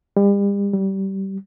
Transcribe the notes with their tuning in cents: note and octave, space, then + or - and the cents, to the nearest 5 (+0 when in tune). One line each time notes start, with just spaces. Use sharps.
G3 +40
G3 -20